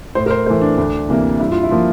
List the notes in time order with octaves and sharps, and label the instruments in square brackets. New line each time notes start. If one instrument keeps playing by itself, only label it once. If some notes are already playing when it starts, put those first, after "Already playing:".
[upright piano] A2 C5
A#4
C5
E3 A3 C5
D4
D2 D4
C3 E3 A#3
G2 E4
F4
E4
F3 A#3